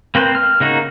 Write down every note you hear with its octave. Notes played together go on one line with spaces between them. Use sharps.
A#3 C4 B4 C5
F6
C#3 A#3 D#4 F#4